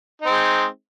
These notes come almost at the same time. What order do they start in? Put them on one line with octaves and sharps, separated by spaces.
D#4 C4 G#3